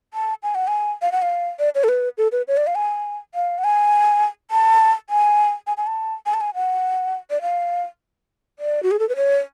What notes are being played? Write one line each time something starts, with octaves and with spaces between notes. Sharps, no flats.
A5
G#5
F#5
G#5
F5
F#5
F5
D5
C#5
A4
B4
A4
B4
C#5
D5
F5
G#5
F5
F#5
G#5
A5
G#5
G#5
G#5
A5
G#5
A5
G#5
F#5
D5
F5
D5
F#4
G#4
A4
B4
C#5